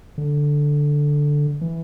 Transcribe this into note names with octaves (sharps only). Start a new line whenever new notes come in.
D3
E3